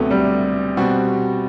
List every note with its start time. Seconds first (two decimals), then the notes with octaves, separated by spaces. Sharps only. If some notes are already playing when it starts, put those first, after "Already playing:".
Already playing: D2 C3 F#3 A3 B3
0.11 G3
0.77 B2 G3 C4 F#4